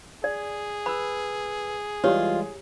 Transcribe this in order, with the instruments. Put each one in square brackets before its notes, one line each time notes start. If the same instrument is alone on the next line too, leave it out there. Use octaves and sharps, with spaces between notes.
[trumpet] G#4 [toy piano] D5
[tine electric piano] B4 E6 [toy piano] B5
[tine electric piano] E3 G3 G#3 [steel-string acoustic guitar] F4 [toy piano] G4 C#5